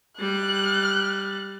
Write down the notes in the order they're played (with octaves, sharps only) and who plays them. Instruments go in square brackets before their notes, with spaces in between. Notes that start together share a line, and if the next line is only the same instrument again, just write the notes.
[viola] G3 [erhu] F#6